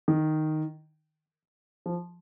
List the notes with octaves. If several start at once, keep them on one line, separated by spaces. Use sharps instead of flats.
D#3
F3